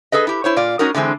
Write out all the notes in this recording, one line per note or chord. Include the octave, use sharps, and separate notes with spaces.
G#4 A4 B4 D#5
E4 G4
E4 C5 C#5
A#2 F4 D5
G#3 C#4 D#4 F#4 A#4
D3 E3 G#3 C4